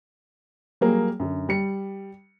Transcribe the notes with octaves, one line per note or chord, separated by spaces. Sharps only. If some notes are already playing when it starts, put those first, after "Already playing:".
F#3 G3 A#3 G#4 A#4
F#2 D3
G3 C#7